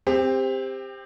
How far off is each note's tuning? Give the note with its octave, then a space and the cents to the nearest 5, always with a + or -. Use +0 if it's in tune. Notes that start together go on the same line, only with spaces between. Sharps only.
C4 +0 G4 +25